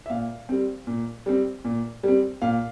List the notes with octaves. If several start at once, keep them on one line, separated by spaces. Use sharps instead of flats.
E5
A#2 F5
G3 C4
A#2
G3 C4
A#2
G3 C4
A#2 F5